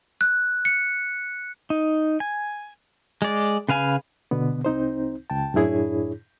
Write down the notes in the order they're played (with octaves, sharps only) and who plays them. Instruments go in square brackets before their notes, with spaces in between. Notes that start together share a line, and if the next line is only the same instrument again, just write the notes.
[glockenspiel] F#6
C#7
[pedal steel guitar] D#4
G#5
G#3 D5
C#3 B4 F5 G#5
[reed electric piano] B2 D3 B3
C2 C4 D#4 C5
C#2 G5 A5
F#2 A2 D4 E4 G#4 C#5